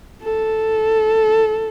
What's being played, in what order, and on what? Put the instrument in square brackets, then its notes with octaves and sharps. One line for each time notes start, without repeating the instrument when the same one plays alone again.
[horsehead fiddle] A4